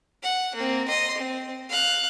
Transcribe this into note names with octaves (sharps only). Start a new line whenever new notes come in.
F#5
A#3 C4
D#5 C6
C4
F5 F#6